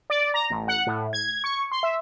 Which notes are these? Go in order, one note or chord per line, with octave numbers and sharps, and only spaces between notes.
D5
A#5
A1
F#5
A2
G#6
C#6
C6
E5